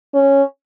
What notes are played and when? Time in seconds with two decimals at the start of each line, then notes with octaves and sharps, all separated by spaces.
0.14 C#4